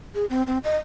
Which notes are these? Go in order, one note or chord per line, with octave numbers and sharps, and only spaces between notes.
G#4
C4
C4
D#5